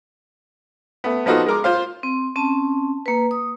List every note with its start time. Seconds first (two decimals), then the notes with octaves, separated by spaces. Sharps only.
1.04 A3 B3
1.26 F3 B3 D#4 F4 F#4 A4
1.46 G#3 A#4 D6
1.64 F4 C5 F5
2.03 C4
2.36 C4 C#4 A5
3.06 A#3 B4
3.31 D#6